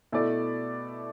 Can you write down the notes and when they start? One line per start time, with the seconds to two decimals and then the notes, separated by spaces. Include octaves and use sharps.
0.12 B2 A3 E4 A4 D5